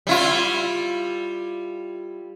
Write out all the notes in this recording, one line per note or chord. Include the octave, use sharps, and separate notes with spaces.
G3 E4 F4